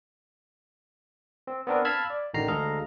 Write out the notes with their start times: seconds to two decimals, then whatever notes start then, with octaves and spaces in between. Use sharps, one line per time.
1.47 C4
1.67 B3 C4 D4 A#4 B4
1.85 F5 A5 B5 E6 F6 G#6
2.10 D5
2.34 A1 D3 D#3 A#5 C7
2.48 D2 G#3 A4 D#5 F5 A#5